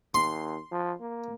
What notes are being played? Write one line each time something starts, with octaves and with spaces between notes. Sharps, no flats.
D#2 C6
F3
A#3